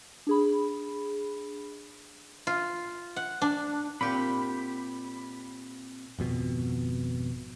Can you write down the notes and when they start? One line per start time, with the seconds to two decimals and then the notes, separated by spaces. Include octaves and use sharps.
0.27 D4 G#4 B5
2.47 F4
3.16 F#5
3.42 D4
4.01 A#2 C4 G4 B5
6.19 G#1 F2 B2